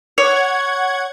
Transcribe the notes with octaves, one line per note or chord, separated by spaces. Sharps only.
C#5 F#5 G#6